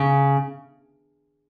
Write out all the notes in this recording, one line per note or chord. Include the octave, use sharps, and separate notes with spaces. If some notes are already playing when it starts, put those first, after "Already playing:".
Already playing: C#3